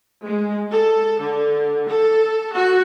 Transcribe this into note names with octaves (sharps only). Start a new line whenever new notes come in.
G#3
A4
D3
A4
F#4